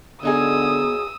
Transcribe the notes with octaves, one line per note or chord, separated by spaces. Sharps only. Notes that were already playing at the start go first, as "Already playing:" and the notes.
D3 F#3 B3 D#4 G#4 D#6 E6